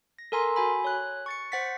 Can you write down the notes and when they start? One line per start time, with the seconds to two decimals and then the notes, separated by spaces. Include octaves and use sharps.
0.19 A#6
0.32 A4 A#4 G#5 A#5 C6
0.56 F#4 G#5 B5
0.84 C#5 F#6
1.26 C#6 A6 C#7
1.52 C5 F#5 A6 B6